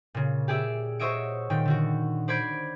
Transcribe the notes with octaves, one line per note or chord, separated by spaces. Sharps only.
A#2 C#3
G4 G#4 D5 E5
F#4 C5 C#5 D#5 E5 D7
A#2 D#3 G5
D3 D#3 F#4
C5 D5 B5 G6 G#6 D7